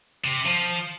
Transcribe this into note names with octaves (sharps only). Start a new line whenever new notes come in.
C3
F3